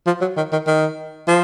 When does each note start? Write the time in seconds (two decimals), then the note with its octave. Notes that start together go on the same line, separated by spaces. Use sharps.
0.07 F3
0.21 F#3
0.37 D#3
0.52 D#3
0.67 D#3
1.27 F3